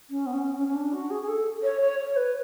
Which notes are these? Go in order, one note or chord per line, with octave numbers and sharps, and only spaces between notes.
C#4
B3
C#4
C#4
C#4
D4
F#4
G#4
G#4
A4
C#5
C#5
C#5
B4